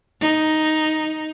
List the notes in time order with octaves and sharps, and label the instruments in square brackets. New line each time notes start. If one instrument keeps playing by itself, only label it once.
[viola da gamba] D#4